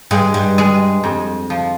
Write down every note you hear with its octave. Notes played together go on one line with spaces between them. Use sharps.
G2 G#3
G2
G#3
F2
F3